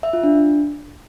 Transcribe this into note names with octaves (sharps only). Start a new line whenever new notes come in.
E5
F4
D4